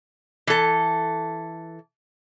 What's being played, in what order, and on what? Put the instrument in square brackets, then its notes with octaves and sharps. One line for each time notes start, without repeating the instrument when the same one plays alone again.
[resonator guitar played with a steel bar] E3 A4